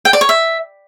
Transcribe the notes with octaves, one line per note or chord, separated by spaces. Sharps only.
G5
D5
C#5
E5